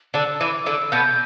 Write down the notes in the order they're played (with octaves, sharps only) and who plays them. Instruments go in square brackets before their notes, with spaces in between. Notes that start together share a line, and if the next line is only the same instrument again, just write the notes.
[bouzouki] D3 D4 [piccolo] E6
[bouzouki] E3 E4 [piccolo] D6
[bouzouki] D3 D4 [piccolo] E6
[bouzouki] B2 B3 [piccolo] G6